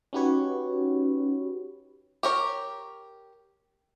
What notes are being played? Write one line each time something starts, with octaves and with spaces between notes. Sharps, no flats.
C#4 D#4 F#4 G4 B4 C#5
G4 A#4 C#5